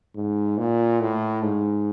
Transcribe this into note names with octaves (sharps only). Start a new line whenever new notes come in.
G#2
A#2
A2
G#2